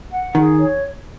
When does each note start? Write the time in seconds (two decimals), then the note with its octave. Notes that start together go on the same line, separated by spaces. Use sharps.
0.11 F#5
0.35 D#3 G#4
0.59 C#5